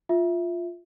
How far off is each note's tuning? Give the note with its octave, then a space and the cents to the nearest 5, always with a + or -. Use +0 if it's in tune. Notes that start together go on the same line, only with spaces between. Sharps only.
F4 +0 E5 +0